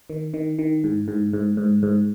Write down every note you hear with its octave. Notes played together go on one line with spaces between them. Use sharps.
D#3
D#3
D#3
G#2
G#2
G#2
G#2
G#2